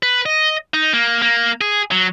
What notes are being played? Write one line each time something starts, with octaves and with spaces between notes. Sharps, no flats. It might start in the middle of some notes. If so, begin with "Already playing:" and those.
B4
D#5
D#4
A#3
A#3
G#4
F#3